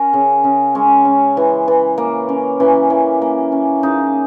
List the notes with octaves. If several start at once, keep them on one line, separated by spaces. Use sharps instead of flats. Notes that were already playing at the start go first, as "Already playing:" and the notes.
Already playing: C#4 A#4
C#3
C#3
G#3 C#4
C#4
E3
E3
A#3
C#4
E3 C#4
E3
A#3
C#4
C#3 D#4